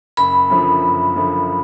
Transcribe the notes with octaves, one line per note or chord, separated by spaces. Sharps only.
F#1 B5
F#2 D3 F3
F#1
F#2 D3 F3